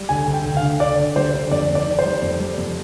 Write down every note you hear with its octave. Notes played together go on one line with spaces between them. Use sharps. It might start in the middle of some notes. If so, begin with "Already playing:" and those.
Already playing: G3
D2 G#5
D2
G5
D2
F5
D2
D2 D5
D2
G3 C5
D2
F2 D5
F2
D5
D#3
C5
G3
F2
G3
F2